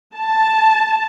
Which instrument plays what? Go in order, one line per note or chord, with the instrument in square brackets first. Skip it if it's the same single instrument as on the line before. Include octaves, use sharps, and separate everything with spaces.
[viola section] A5